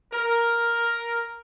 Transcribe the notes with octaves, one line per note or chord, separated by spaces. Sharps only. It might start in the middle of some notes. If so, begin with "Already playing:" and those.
A#4